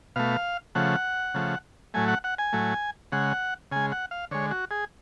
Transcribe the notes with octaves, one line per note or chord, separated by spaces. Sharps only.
B2 A3 F5
C#3 F3 A3 F#5
C#3 F3 A3
A2 F#3 A3 G#5
F#5
F#5
G#5
A2 F#3 A3
C#3 G#3 F#5
C#3 G#3 G#5
F#5
F5
D3 G#3 C#5
F#4
G#4